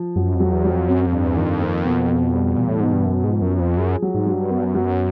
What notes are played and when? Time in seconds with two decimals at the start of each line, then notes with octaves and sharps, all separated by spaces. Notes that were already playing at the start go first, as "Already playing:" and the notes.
Already playing: F3
0.16 F#2 F#3
0.35 F2
0.40 F#3
0.52 E2
0.65 F#3
0.70 F2
0.88 F#2 C4
1.07 F2
1.12 G2
1.25 E2
1.37 D#3
1.42 F2
1.60 A#3
1.85 B2
2.08 B2
2.33 G3
2.57 E2 A#2
2.68 A2
2.80 G#2 B2
2.93 G2
3.06 F#2 B3
3.24 G#2
3.29 F3
3.42 F#2
3.54 F3
3.60 F2
3.77 F#2 G#4
4.02 F#3
4.15 G#2
4.26 F#3
4.32 G2
4.50 F#2 B3
4.58 G2
4.64 F#2
4.75 F#3